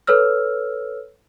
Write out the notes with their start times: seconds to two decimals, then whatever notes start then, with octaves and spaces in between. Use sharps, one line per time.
0.07 A4 B4 C#5 E6 F6